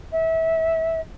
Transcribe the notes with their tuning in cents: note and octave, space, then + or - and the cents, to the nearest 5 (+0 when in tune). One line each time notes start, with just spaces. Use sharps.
E5 -25